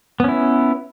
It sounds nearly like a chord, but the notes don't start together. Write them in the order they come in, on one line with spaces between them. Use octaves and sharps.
B3 C#4 E4